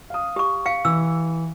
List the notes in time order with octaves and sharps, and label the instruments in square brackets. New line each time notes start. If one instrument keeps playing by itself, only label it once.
[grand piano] F5 D#6
[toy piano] G4 C#6
[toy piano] F5 [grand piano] C#7
[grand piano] E3 [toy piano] E6